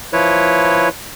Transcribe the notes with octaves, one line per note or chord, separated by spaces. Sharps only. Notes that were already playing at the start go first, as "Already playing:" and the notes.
F3 E4 B4 C#5